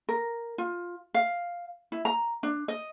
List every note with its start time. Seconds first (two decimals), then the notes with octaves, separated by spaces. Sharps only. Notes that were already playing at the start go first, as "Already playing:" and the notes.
0.09 A#4
0.58 F4
1.14 F5
1.92 E4
2.05 A#5
2.43 D4
2.68 D#5